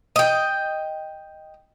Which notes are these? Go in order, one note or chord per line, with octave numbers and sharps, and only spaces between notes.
D#5 G5